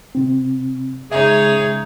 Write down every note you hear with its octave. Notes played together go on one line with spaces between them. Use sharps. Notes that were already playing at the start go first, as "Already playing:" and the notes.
C3 C4
C#3 G#3 D#4 G#4 C#5 E5